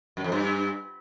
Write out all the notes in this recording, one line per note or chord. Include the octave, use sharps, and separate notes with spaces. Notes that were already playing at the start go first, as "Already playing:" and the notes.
F#2
F2
G2